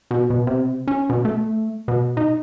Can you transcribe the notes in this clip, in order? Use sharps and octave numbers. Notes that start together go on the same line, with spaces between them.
B2
B2
C3
C#4
B2
A3
B2
D#4